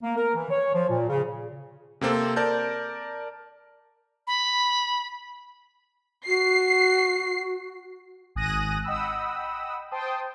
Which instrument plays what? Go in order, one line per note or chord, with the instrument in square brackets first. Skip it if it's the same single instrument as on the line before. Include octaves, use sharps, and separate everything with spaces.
[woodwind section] A#3
A#4
E3
C#5
F3
A#2
C#3
[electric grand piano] C3 A#3 C4 A4
A#4 D5 A5 G6
[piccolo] B5
[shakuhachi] F#4 [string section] C7
[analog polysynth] G#1 G#5 D#6 F#6 A#6 D#7
D#5 F#5 G5 B5 D#6 E6
C5 G5 A5 C6 D#6